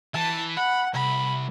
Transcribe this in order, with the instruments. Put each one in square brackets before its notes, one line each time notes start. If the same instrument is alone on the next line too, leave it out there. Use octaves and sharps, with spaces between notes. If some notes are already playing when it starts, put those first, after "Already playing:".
[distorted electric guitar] E3 [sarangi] A5
[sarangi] F#5 [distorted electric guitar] B5
[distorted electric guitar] C2 [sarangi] B5